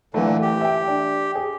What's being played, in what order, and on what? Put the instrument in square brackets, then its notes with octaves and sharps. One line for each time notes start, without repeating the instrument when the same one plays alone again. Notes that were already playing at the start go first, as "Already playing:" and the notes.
[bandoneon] A#2 D3 [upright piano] E3 A3
[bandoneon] G4
[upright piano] E5 G5
D4
G#4